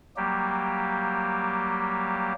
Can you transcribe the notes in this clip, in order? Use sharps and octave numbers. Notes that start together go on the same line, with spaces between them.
F#3 G3 A#3 G4